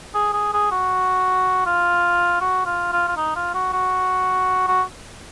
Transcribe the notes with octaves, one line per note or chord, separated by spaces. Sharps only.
G#4
G#4
G#4
F#4
F4
F#4
F4
F4
F4
D#4
F4
F#4
F#4
F#4